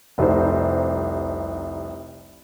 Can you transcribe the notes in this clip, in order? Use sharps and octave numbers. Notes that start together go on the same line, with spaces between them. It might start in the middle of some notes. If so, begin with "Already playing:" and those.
F1 C2 D#4 C5